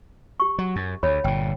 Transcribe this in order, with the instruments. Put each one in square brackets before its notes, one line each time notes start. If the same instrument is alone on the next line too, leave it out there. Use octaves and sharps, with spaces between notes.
[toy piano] G4 C#6
[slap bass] F#3
F#2
[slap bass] D2 [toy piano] C#5 B5
[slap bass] G1 A#2 [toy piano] G5